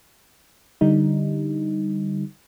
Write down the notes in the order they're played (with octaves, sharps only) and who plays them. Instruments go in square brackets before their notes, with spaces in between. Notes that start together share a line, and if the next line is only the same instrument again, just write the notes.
[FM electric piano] D3 G3 D#4